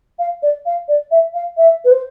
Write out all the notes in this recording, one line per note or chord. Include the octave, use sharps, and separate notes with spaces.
F5
D5
F5
D5
E5
F5
E5
B4
C5